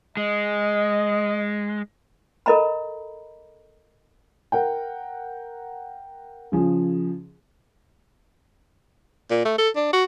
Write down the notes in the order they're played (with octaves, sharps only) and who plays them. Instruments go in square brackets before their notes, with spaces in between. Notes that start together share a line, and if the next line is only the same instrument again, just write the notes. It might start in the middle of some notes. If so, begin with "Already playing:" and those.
[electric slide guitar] G#3 [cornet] D#5
[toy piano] A4 A#4 D#5 A#5 B5
[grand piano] A#4 F#5 G5
C#3 F3 G#4
[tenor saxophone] A#2
A3
A4
D4
F#4